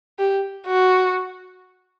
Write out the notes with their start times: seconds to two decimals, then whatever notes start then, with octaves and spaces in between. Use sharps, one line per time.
0.19 G4
0.67 F#4